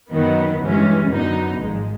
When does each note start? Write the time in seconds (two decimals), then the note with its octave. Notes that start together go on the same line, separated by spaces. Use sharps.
0.11 F#2 D#3 F#3 B3
0.60 G2 E3 G#3 C#4
1.09 F#2 D3 F#3 B3 D#4
1.58 G#1 G#2 F3 G#3